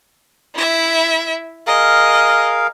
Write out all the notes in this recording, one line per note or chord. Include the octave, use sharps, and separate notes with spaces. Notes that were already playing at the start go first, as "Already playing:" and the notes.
E4 E5
G#4 A#4 D#5 F5